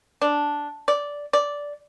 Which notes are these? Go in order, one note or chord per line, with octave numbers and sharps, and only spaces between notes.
D4
D5
D5